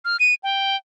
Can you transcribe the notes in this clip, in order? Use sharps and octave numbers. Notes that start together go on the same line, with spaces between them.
F6
D#7
G5